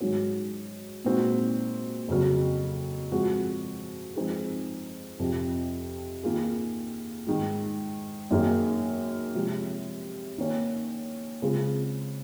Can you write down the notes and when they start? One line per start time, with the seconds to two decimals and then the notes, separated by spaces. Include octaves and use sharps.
0.01 G#2 D#3 F#3 C#4 F#4
1.04 A#2 G#3 C4 D#4 F#4
2.08 F2 C#3 F#3
3.12 F3 G#3 C4 F#4
4.16 F3 G#3 C4 D#4 G#4
5.19 F2 C3 F3
6.23 D#3 A#3 F4 G#4
7.27 G#2 D#3 G#3
8.31 F#2 D#3 A#3 D#4 G#4
9.35 C3 F3 G#3
10.38 D#3 A#3 C#4
11.42 C#3 G#3 C4 F4 G#4